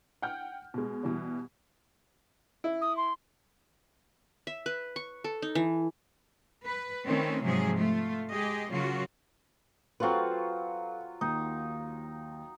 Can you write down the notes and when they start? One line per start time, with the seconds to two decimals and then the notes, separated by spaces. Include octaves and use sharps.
0.22 F#5 G5 F6 G6
0.74 B2 G#3
1.03 B2 E3 G3
2.64 E4
2.81 D#6
2.97 C6
4.47 E5
4.66 B4
4.96 C#6
5.24 A4
5.42 D#4
5.55 E3
6.66 B4
7.05 D#3 A3 C4 C#4 B4
7.44 G#2 C3 F3 F#3 G#4
7.78 A3 F4
8.31 G#3 G4 G#4 D#5
8.70 C#3 F#3 A#3 F4 F#4
10.00 F#3 C4 F4 G4 A4 B4 F#5 C#6
11.21 D#2 D#4